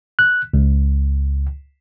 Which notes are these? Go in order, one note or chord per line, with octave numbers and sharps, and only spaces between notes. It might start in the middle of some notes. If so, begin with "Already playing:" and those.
F#6
C#2